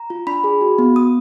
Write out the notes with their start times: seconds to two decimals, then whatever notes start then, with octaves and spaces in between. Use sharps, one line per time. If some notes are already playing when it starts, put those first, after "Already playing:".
Already playing: A#5
0.10 F4
0.27 D4 B5
0.44 G#4
0.61 F#4
0.78 B3
0.96 B3 D#6